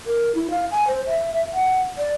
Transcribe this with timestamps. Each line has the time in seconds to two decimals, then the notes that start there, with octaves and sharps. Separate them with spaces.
0.07 A#4
0.35 E4
0.50 F5
0.71 G#5
0.87 C5
1.07 E5
1.53 F#5
1.98 D5